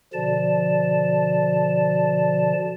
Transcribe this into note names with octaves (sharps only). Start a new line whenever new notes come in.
B2 D3 F3 D5 A5